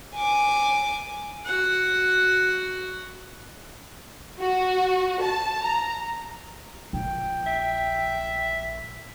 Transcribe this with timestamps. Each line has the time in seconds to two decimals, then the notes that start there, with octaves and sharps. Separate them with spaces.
0.14 G#5 D6
1.45 F#4 F#5
4.40 F#4
5.22 A5
5.64 A#5
6.93 A#1 G5
7.47 E5